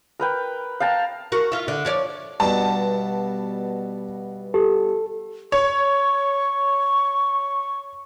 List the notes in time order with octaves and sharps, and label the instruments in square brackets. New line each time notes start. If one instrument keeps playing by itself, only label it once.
[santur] A#4 B4 G5
F5 G5 A5 A#5
[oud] F#4 A#4
F4 E5
D3
F3 C#5 D5
[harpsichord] G2 B2 [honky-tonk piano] A5
[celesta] G4 [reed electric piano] A4
[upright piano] C#5 [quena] C#6